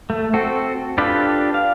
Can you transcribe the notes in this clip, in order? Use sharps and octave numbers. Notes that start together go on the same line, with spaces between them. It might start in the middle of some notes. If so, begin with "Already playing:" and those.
A3
C4 F#4 A4
D4 F4 G4 A4 B4
F5